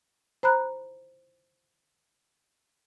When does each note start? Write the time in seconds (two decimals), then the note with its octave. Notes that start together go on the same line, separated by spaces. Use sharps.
0.43 C5 A#5 B5 F#6